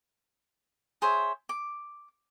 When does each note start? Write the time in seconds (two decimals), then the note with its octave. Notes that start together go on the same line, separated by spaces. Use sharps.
1.02 G#4 C5 C#5 E5
1.49 D6